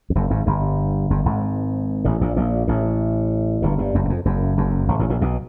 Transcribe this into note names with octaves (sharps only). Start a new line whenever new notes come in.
F2
F#1 F#2
G#1 G#2
G1 G2
G1 G2
G#1 G#2
A1 A2
A#1 A#2
A#1 A#2
A1 A2
G1 G2
G1 G2
F#1 F#2
F#2
F2
F#1 F#2
F#1 F#2
G#1 G#2
A1 A2
A#1 A#2
B1 B2